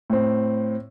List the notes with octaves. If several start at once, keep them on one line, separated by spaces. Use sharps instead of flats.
A2 C4